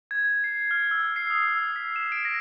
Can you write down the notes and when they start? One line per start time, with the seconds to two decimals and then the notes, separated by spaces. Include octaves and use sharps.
0.11 G#6
0.44 C7
0.71 F6
0.91 E6
1.16 C7
1.30 D#6
1.48 E6
1.76 B6
1.96 E7
2.12 D7
2.25 A#6